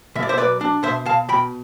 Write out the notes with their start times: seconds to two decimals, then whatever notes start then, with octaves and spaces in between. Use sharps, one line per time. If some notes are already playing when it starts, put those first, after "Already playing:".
0.15 B2 E5
0.23 D5
0.29 C5 E5
0.38 B1 B4 D5
0.61 D4
0.83 B2 C5 E5
1.06 B2 F5 A5
1.28 B2 G5 B5